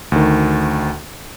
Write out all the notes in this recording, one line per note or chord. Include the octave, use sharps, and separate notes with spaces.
D2 D#3